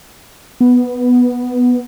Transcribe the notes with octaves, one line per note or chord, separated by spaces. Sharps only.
B3